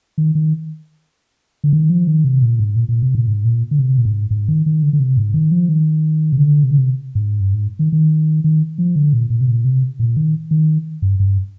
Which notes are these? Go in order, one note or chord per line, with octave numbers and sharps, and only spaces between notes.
D#3
D#3
D3
D#3
F3
D#3
C3
A#2
G#2
A#2
A#2
C3
A#2
G#2
A#2
D3
C3
A#2
G#2
G#2
D#3
D#3
D3
D3
C3
G#2
D#3
F3
D#3
C3
D3
C3
D3
C3
G#2
G2
G#2
D#3
D#3
D#3
F3
D3
A#2
A#2
C3
A#2
C3
A#2
D#3
D#3
G2
G2